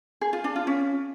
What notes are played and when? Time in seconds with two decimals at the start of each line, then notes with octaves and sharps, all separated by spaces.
0.21 G#4
0.33 F4
0.44 D4
0.56 F4
0.67 C#4